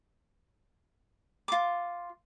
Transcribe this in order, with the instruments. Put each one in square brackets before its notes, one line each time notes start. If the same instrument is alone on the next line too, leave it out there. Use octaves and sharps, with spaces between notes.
[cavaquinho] F4 D6